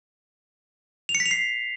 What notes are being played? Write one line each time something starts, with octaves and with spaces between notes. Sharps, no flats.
F7
C#7
B6
F7
C7